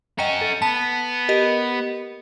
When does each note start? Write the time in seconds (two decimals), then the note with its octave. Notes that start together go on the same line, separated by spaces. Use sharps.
0.18 C#4 F#4 D#5 G5 A#5
0.41 A4
0.62 B3 A5
1.29 G4 A#4 D#5